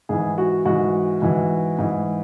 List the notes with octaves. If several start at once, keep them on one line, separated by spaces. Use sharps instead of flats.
G#2 E3 G#4
F#4
G#2 E3 F#4
G#2 E3
G#2 E3